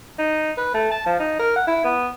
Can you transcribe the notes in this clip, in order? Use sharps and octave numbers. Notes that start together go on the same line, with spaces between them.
D#4
B4
A3
A5
F3
D#4
A#4
F#5
E4
B3